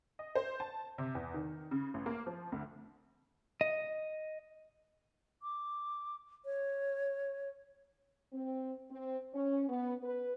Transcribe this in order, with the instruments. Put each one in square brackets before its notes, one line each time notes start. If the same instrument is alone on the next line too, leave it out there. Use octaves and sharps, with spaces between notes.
[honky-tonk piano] D#5
C5
A5
C3
E2
D#3
C#3
A1
A#3
F3
D2
[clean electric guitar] D#5
[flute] D6
C#5
[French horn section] C4
C4
C#4
B3
B4